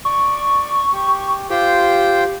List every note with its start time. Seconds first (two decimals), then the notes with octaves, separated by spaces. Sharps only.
0.05 D5 C#6
0.93 G4
1.50 F4 G4 C5 G5